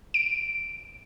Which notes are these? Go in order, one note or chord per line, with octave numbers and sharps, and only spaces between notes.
D7